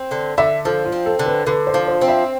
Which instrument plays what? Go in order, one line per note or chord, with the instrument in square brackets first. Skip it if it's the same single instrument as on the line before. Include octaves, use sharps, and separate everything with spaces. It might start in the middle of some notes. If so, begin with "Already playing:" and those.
Already playing: [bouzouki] C4
D3
[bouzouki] D3 [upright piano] E5
[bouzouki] F3 [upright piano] A4
[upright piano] F4
[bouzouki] C4
[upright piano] A4
[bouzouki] D3
[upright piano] B4
[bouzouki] D3 [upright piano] B4
[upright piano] C5
[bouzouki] F3
[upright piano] C5
[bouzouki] C4
[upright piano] E5